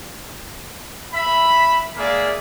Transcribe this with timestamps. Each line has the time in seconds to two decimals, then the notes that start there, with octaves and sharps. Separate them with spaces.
1.13 E5 B5
1.96 G#3 A#3 G#4 D5 E5 F5